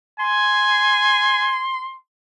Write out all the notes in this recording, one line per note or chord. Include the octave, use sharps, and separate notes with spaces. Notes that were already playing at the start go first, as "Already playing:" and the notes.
G#5 C6